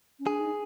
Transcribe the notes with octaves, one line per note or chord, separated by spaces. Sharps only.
C#4
D4 G#4
D#4